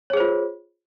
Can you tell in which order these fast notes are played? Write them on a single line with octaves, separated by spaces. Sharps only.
C#5 G#4 C5 F4